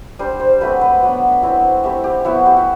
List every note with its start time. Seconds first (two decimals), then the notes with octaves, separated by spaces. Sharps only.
0.19 G3 D4 C5
0.40 C5
0.61 F#3 A3 C4 B4
0.81 B4
1.02 F#3 B3 D4
1.42 F#3 C4 E4
1.84 A3 C4 E4 G4
2.04 G4
2.25 F#3 B3 E4 F#4
2.46 G4
2.57 F#4